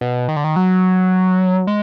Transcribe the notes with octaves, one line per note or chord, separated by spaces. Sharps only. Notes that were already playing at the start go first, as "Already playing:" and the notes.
B2
D#3
D3
D#3
F#3
G#3